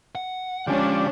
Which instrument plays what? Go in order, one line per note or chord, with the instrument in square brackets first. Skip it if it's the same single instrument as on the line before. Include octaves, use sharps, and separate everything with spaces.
[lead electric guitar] F#5
[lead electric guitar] D3 G#3 [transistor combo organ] F3 G4 D5 [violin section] C#4 D4